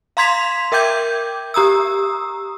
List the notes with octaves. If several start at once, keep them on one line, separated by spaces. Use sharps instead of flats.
F5 A#5 C6 G#6 B6 F7
A#4 E5 G5 D6 G6 G#6
G4 A#5 D#6 E6